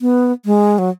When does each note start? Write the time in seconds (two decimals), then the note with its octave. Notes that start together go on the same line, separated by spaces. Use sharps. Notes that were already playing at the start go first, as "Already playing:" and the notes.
0.01 B3
0.45 G#3
0.78 F#3